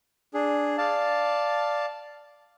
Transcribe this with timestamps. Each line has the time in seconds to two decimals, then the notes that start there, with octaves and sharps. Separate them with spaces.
0.34 D4 G#4
0.78 D5 F5 A5